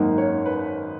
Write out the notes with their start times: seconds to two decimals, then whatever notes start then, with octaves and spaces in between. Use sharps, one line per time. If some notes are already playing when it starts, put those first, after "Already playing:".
Already playing: G#1 F#2 D#3 A#3 D#4
0.18 C#5
0.46 B4